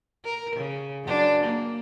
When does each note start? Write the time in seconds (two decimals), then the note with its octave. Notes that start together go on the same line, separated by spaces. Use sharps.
0.25 A#4
0.56 C#3
1.04 F#2 D4
1.44 A#3